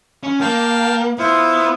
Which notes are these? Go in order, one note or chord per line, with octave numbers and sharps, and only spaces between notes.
C#4
A#3 F5 G5 A5
B3 E4 F4 C5